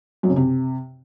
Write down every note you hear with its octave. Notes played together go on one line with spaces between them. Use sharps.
F#2
C#3
C3